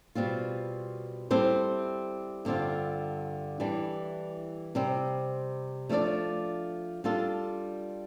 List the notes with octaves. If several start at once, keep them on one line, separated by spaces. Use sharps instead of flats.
B2 G3 C4 F4
G3 C4 E4 A4 C5
G2 D3 G3 C4 F4
E3 G3 D4
C3 G3 C4
F3 A3 D4 A4 D5
G3 D4 F4 A4